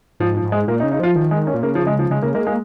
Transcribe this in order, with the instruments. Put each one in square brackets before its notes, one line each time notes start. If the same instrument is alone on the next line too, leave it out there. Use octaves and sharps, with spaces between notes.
[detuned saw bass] G#2 [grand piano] F3
[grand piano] F3
[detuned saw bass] G#2
[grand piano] G#3
[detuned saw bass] A#2 [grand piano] A#3
[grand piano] D#4
[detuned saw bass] C#3
[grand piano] D#4
[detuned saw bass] F3 [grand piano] F4
[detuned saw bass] D#3 [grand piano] F3
[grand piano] G#3
C#4
[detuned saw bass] A#2
[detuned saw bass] C#3 [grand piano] A#3
[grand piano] F3
G#3
F3
[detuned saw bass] C#3 [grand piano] G#3
[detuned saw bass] C#3 [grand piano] A#3
[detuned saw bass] G#3 [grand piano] A#3
[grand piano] G#3 [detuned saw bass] A#3